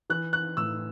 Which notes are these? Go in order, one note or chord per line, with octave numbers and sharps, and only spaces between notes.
E3 F#6
F#6
A2 E6